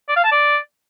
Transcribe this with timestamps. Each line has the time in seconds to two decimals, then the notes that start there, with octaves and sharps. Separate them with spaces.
0.09 D5
0.16 F5
0.24 A5
0.32 D5